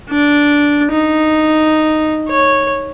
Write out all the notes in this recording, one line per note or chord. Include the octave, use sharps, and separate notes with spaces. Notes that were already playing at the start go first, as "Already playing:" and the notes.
D4
D#4
C#5